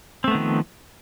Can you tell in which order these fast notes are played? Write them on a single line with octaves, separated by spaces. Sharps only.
C4 A3 B3 D#3 F3